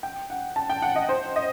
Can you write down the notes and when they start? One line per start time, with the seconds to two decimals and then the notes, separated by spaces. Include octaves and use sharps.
0.03 G5
0.30 F#5
0.56 A5
0.70 G5
0.82 F#5
0.96 D#5
1.09 C5
1.36 D#5